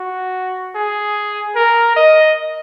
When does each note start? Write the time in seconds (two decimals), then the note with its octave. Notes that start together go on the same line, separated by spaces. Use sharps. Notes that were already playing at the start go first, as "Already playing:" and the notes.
Already playing: F#4
0.75 G#4
1.56 A#4
1.96 D#5